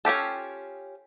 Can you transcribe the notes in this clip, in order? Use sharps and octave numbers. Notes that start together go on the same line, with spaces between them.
C#4 F4 G4 A4